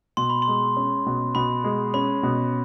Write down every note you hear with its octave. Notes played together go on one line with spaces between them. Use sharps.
B2 C6
B5
C6
G#3
C#4
B2
B2 B5
G#3
C#4 B5
B2